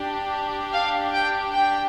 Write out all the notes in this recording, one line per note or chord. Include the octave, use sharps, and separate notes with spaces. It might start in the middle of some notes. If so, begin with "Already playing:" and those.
Already playing: D4 G4
F5
G5
G5